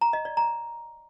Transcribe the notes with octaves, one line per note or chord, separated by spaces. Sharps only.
A#5
D#5
D5
A#5